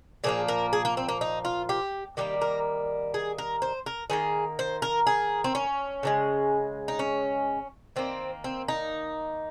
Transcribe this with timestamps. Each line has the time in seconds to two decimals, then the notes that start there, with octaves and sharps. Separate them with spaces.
0.24 A#2 F3 A#3 G#4
0.48 A#4
0.73 G#4
0.85 A#3
0.97 C4
1.09 A#3
1.21 D#4
1.45 F4
1.69 G4
2.17 D#3 G3 A#3 G4
2.41 A#4
3.14 G#4
3.38 A#4
3.62 C5
3.86 A#4
4.10 D#3 A#3 G#4
4.59 C5
4.82 A#4
5.07 G#4
5.44 C4
5.55 C#4
6.03 C#3 F3 G#3
6.88 D#4
6.99 C#4
7.96 D#3 A#3 C4
8.44 C4
8.68 D#4